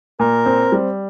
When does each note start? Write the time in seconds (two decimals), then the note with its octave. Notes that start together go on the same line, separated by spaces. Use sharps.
0.20 A#2 A#4
0.46 C4
0.72 G3